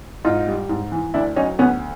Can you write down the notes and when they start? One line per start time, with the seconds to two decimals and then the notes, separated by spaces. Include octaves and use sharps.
0.24 G#2 D#4 F4
0.47 G3
0.69 G#2
0.92 E3
1.14 D2 D4 E4
1.36 F#3 C#4 D#4
1.59 D2 B3 C#4